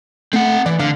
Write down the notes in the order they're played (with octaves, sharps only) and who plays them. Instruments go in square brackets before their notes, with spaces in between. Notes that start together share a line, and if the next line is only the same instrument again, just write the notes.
[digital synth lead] A3 [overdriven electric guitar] C4 F#5
[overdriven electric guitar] E3 [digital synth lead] D5
[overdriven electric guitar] D3 [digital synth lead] F5